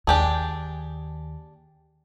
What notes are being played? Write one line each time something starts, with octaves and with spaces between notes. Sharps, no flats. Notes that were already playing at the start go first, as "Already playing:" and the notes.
D#2 D4 G4 G#4 G#5 A5